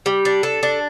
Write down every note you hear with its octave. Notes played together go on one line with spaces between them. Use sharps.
G3
D4
A4
D4